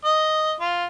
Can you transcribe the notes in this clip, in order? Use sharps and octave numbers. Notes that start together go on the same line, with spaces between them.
D#5
F4